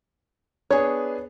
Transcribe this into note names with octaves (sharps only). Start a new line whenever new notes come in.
B3 D4 G#4 C#5